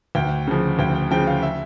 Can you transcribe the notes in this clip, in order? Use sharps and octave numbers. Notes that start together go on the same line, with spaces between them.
D2 G5
C#3 F3
D2 G5
G5
C#3 F3 G5
F5
E5